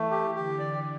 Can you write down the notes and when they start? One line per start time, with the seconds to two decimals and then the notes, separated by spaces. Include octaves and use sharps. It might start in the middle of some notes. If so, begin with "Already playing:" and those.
Already playing: E3 A3
0.11 G4
0.35 D3 G4
0.59 D5